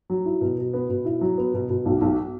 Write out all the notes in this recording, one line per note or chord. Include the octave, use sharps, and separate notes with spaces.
F#3
E4
B2
B2
B3
B2
E4
F#3
B3
B2
B2
B1
B1